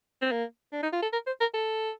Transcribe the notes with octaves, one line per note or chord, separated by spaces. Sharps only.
C4
A#3
D4
D#4
F4
A4
A#4
C5
A#4
A4